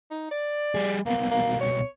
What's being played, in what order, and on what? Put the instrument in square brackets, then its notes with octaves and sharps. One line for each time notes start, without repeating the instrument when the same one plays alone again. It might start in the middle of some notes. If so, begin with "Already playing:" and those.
[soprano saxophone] D#4
D5
[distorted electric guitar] G3 G#4
[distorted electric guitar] C2 B2 [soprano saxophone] A#3
[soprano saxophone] A#3
C#5